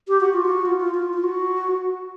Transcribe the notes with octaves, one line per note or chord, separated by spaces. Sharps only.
G4
F#4
F4
F#4
F4
F4
F4
F4
F#4